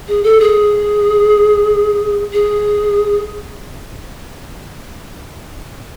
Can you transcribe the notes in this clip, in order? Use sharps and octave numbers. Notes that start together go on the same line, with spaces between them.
G#4
A4
G#4
G#4